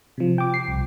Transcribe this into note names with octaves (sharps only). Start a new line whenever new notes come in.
C3 F3
G5 D6
C7
C2